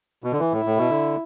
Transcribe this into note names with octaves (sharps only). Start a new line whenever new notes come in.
B2
D3
E3 E4
A2
A2
B2
D3